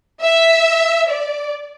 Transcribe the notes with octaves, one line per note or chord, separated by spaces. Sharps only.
E5
D5